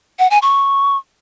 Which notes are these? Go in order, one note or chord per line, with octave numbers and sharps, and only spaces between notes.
F#5
G#5
C#6